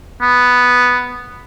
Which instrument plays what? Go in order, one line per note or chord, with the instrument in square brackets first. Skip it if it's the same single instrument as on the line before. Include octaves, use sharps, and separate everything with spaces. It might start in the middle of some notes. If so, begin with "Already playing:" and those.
[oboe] B3